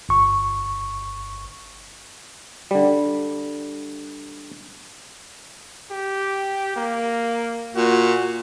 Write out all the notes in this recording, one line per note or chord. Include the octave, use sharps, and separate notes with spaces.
G1 C#6
D3 G3
G4
A#3
A#2 F#4